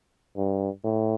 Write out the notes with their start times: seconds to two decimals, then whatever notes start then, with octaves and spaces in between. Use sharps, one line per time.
0.37 G2
0.84 A2